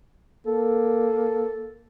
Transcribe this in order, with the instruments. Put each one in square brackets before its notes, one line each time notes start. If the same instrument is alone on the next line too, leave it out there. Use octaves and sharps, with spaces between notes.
[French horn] A#3 [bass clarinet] A4